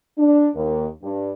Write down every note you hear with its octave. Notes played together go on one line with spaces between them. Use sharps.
D4
D#2
G2